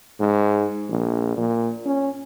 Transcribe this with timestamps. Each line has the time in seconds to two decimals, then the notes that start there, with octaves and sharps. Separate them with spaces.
0.20 G#2
0.89 A#1
1.37 A#2
1.86 C#4